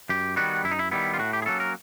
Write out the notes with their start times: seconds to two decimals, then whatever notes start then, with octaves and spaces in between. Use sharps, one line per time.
0.09 F#2 G4
0.36 D#3 G3 B3 F#4
0.64 F#2 E4
0.71 D#4
0.79 E4
0.91 D#3 G3 B3 E4
1.14 F4
1.19 A2 F#4
1.33 G4
1.42 G#4
1.46 F#3 A#3 C#4 A4
1.60 A#4